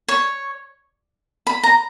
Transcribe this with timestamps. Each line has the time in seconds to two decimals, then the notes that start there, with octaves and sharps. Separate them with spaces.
0.08 C#5
1.47 B5
1.63 A#5